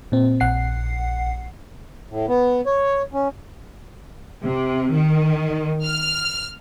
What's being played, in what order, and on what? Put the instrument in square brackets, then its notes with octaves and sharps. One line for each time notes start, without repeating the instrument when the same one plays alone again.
[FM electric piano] A#2 C4
A#1 F#5 C7
[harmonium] A2
B3
C#5
C#4
[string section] C3
D#3
F6